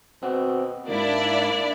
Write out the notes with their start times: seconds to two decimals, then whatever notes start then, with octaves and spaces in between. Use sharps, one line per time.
0.23 B2 C4 F#4
0.88 D2 G#2 A#3 D4 E4 D5